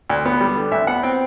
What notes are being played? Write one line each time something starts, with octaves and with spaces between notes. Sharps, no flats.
D2
B3
G3
D3
D2 E5
B3 F#5
C4 G5